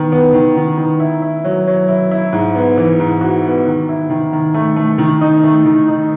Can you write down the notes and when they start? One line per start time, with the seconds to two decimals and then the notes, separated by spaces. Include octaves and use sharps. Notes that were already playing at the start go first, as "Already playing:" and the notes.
Already playing: D#3 B3
0.12 B3
0.33 D#3
0.56 D#3
0.78 D#3
1.00 E4
1.22 E4
1.45 F#3
1.67 F#3
1.88 E4
2.11 E4
2.33 G#2
2.55 B3
2.77 E3
3.00 G#2
3.21 F#4
3.44 B3
3.66 D#3
3.89 E4
4.10 D#3
4.33 D#3
4.54 A3
4.76 A3
4.98 D#3
5.21 D#4
5.43 A3
5.65 D#3
5.88 D#4